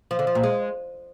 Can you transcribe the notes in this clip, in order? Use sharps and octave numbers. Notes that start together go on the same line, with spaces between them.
F3
D3
F3
A#2
G#3